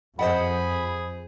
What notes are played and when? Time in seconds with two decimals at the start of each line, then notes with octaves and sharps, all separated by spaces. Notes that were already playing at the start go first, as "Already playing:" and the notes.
0.19 F2 G#4 C5 D#5 F#5 B5